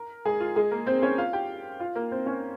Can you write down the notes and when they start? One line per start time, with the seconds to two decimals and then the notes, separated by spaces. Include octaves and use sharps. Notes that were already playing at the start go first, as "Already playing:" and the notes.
Already playing: A#4
0.25 G#3 G#4
0.40 F4
0.56 G#3 G#4
0.71 A#3 A#4
0.86 C4 C5
1.02 C#4 C#5
1.17 F4 F5
1.33 G4 G5
1.80 F4 F5
1.95 A#3 A#4
2.11 C4 C5
2.26 C#4 C#5